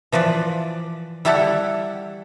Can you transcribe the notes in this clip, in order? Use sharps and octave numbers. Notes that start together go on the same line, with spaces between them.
E3 F3 B4 D5
G3 E4 G4 A4 F#5